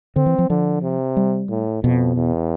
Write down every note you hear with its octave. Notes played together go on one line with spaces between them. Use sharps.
D3 C4
E3
F3
D3 F3
C3
G3
A2
F2 B2
E2